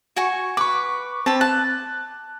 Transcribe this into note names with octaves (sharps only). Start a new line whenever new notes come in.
F#4 G#5 C#6
B4 C#6 D6
C4 A5 B5
A5 F#6